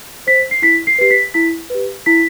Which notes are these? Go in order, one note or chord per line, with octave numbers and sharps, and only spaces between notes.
C5 B6
C7
E4 B6
C7
G4 B4 C7
B6
E4 B6
G4 B4
E4 B6